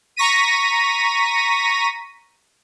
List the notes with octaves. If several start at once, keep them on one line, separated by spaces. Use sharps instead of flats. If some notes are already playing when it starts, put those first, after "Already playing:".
A#5 C#6 A#6 B6 D#7